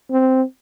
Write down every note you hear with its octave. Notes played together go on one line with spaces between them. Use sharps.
C4